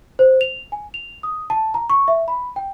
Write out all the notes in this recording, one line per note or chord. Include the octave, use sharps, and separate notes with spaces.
C5
F7
G#5
F7
D#6
A5
A#5
C#6
E5
B5
G5